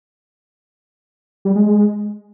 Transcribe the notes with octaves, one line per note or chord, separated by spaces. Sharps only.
G3
G#3
G#3